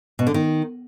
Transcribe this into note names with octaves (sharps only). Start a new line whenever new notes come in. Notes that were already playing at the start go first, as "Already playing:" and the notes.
B2
D3
D#3